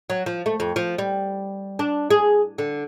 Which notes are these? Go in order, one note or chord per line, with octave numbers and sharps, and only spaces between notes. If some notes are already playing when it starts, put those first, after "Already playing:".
F#3
F3
A3
F2
F3
G3
D4
G#4
D3